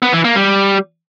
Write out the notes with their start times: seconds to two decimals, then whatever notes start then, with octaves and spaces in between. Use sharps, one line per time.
0.02 B3
0.13 E3
0.24 A#3
0.35 G3